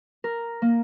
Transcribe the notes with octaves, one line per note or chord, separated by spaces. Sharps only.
A#4
A#3